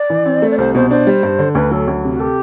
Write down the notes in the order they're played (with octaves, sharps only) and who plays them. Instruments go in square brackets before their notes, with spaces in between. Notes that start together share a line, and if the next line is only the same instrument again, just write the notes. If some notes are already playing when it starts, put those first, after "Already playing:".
Already playing: [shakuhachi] D5
[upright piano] E3
C4
A3
[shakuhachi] D5
[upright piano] C2 [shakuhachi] C5
[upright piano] B2 [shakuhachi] C5
[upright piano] D4 [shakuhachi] C5
[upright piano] G3
G2
D3
[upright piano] D2 [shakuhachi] B4
[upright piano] F#3 [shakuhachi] A4
[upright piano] D2
C3
[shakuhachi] F#4
[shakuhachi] G4 [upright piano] A4